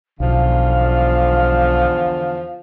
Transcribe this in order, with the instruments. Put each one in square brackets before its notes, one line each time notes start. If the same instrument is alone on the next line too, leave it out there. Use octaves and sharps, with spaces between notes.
[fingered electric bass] B1 [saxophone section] E2 D3 F3 [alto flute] F5